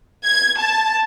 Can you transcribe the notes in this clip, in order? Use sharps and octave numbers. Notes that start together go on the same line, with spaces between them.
G#6
A5